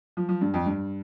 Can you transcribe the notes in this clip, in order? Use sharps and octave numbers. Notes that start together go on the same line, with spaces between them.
F3
F3
G2
F2
G2